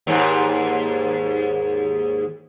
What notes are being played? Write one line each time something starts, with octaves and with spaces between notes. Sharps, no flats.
D#2 G#2